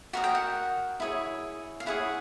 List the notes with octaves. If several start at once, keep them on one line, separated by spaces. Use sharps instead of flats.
F#4 A#4 D#5 F#5
G5
F#5
E4 G#4 C#5
F5
E4 G#4 C#5 F#5